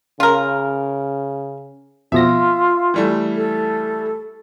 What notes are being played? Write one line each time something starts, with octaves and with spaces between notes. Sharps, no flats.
C#3 F4 A#4
F2 B2 F4 E5 A#6
E3 G3 A3
A4